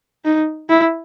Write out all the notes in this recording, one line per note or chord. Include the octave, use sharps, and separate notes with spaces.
D#4
E4